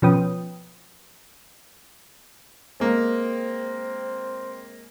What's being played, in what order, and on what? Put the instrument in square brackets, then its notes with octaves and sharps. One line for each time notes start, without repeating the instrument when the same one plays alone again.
[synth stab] B2 F3 C#4 B4 G5 D#6
[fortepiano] G#3 A#3 [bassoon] C4